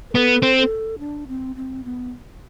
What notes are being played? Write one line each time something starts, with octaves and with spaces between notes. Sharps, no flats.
B4
B3 A4
C4
A4
D4
C4
C4
B3